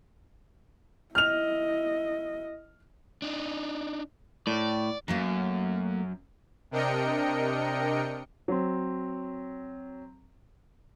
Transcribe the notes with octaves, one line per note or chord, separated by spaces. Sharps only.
E4 D#5 F6 F7
D4 D#4
A2 D5
F#2 F#3 A3 A#3
C3 D4 A#4 D#5 G5 C#7
F#3 C4